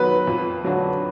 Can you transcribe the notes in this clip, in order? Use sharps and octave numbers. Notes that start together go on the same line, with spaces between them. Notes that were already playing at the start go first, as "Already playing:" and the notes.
Already playing: D#3 F#3 B3 B4
F2
D3 F#3 D4 F#4